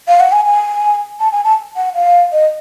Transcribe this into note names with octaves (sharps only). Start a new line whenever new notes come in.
F5
F#5
G#5
G#5
A5
G#5
A5
F#5
F5
D#5